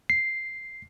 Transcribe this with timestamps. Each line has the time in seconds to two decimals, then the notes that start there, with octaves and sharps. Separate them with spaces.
0.10 C7